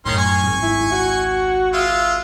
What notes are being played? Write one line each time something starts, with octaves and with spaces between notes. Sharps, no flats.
F#2 A2 D#3 C#4 C6
G#5 C#6
G#1 C#2
E4
F#4
G#3 F4 E5